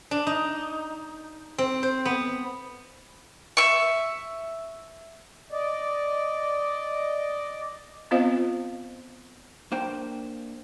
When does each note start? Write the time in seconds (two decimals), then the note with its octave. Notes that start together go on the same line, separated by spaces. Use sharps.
0.11 D4
0.27 D#4
1.58 C4
1.83 C5
2.05 B3
3.57 E5 C#6
5.51 D5 D#5
8.11 B3 C4 F4 C5 D#5 F5
9.72 A#3 D4 C5 G5